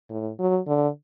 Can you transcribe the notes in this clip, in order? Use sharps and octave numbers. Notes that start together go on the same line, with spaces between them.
A2
F#3
D3